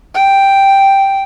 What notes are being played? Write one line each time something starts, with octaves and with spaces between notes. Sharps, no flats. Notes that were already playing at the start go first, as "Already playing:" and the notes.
G5